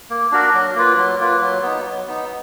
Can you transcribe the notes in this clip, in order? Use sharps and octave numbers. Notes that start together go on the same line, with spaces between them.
A#3
D4 F#4 A#4
F#3
A#3 F4 B4
F#3
A#3 F4 B4
F#3
B3 D#4
F#3
B3 D#4